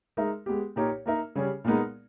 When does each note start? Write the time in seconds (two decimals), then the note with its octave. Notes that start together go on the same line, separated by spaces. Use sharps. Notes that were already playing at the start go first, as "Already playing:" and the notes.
0.17 G#3 D#4 A#4 E5
0.46 G#3 B3 G4
0.76 A#2 A#3 D#4 G4 C#5
1.06 A#3 D#4 A#4 E5
1.35 C#3 G3 C#4 G#4
1.64 A#2 G#3 B3 D#4 A#4